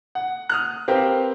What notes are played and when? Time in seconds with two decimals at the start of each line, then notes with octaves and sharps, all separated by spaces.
0.15 F#5
0.49 D#6 F6 F#6
0.88 C4 G4 A#4 B4 F5 G5